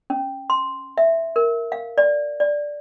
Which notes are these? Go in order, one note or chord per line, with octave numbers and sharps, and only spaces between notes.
C#4
C6
E5
A#4
F5
D5
D5